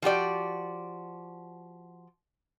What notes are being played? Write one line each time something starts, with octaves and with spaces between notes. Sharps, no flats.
F3 F#4 G4 D5